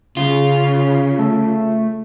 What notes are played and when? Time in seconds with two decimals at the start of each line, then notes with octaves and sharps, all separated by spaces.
0.17 C#3 F4
1.19 A3